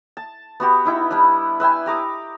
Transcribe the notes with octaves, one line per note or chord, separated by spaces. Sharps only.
A5
B3 F#4 G4
D#4 E4 G5
G3 D4
B4 E5 G5 G#5
G4 A#5 D6 D#6